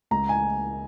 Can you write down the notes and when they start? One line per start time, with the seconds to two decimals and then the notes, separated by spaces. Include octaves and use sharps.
0.11 C#2 A#5
0.29 G#5